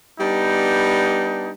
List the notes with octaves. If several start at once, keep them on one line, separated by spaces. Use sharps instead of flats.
G3 B3 D4 D#4